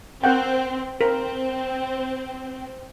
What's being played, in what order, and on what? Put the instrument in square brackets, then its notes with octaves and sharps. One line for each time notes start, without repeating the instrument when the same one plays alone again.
[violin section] C4 [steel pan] A#4 F#5 G5
[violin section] C4 [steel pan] A#4